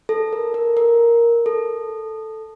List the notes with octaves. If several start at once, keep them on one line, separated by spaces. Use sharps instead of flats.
A4
A#4
A#4
A#4
A4